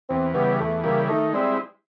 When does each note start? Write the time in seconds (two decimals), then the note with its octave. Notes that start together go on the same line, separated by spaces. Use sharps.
0.09 E2 C4
0.34 C#3 E3 G3 B3
0.60 E2 A3
0.84 C#3 E3 G3 A#3
1.08 D#3 A3
1.33 G3 G#3 C4 E4